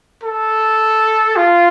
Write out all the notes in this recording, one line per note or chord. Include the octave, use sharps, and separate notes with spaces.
A4
F4